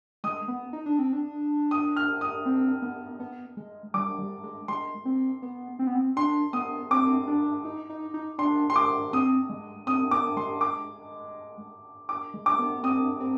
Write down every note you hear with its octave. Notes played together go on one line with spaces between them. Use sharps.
G#3 D#6
B3
D#4
D4
C4
D4
D#6
F6
D#6
C4
B3
B3
G#3
G3 D6
G3
G#3
G#3 C6
C4
B3
C4
B3
C4
D4 C6
B3 D#6
C4 D6
D4
D#4
D#4
D#4
D4 C6
C6
D6
C4 D#6
G#3
C4 D#6
B3 D6
G#3 C6
D6
D6
G#3
D6
B3
C4 D#6
C4